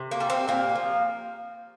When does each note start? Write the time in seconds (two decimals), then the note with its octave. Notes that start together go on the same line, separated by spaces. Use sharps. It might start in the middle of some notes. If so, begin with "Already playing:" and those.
Already playing: C3
0.11 A#3
0.20 G3
0.30 C4
0.48 A#2 A#3
0.75 F3